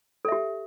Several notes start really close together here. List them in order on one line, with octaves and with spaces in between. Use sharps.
A4 E5 G4